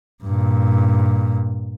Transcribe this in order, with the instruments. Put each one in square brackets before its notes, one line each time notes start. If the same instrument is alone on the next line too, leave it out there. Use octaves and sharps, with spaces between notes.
[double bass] G2 A#2